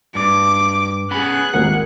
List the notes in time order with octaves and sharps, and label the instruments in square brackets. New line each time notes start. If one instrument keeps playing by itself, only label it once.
[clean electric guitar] G2 [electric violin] D6
[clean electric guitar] B3 C#4 B5 [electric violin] G#4 F#6
[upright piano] D#1 G#1 A#3 [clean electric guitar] F#5